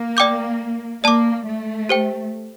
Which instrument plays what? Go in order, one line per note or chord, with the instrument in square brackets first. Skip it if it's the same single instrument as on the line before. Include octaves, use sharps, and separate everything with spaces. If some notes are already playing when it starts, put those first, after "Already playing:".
Already playing: [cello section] A#3
[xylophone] D5 G5 D6 G6
[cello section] A#3 [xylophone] D5 A5 D6
[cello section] A3
[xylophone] G4 C5 G5